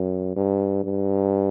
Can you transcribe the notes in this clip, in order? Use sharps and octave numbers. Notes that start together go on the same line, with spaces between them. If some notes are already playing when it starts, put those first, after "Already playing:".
Already playing: F#2
G2
G2